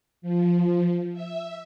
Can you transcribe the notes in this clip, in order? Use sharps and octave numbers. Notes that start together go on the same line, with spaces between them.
F3
E5